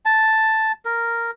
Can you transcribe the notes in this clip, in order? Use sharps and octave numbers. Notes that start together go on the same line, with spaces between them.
A5
A#4